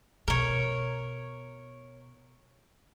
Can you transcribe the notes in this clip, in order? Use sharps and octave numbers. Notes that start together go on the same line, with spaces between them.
B2 A#4 C#5